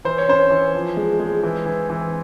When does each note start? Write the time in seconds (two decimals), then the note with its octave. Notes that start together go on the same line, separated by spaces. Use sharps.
0.05 E3 C5
0.18 C#5
0.28 C#4 C5
0.51 E3
0.75 F3
0.97 G#3
1.20 G#3
1.43 E3
1.66 E3
1.90 E3